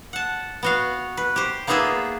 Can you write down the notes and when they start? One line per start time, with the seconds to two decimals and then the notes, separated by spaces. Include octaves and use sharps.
0.13 F#5 A5
0.63 B3 F#4 F5
1.17 B4
1.36 G4 C5
1.67 A#3 B3 D#4 F4 G#4 E5